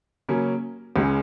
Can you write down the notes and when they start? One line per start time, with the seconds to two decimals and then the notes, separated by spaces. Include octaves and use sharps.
0.29 C#3 F#3 A#3 C#4
0.96 C#2 C#3 G#3 C#4